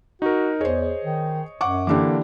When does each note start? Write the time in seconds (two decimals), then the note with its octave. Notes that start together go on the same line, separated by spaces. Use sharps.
0.22 D#4 F#4 A#4
0.61 E2 G#4 C5 C#5 D#5
1.04 D#3
1.61 F#2 F#5 C#6 D6
1.87 D3 E3 A#3 D4 G4 D6